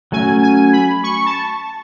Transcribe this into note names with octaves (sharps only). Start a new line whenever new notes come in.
F#3 A3 C#4 G#5
G#5
B5
C#6
A5